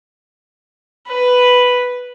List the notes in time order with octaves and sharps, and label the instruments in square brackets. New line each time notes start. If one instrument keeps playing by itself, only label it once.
[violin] B4